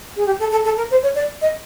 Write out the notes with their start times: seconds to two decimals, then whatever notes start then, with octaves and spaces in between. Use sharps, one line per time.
0.16 G#4
0.26 G4
0.40 A4
0.51 A4
0.65 A4
0.77 A#4
0.91 C5
1.03 C#5
1.15 D5
1.42 D#5